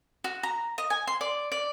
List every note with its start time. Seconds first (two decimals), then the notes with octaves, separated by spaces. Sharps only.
0.24 F#4
0.43 A#5
0.78 D#5
0.90 G#5
1.08 C6
1.21 D5
1.52 D5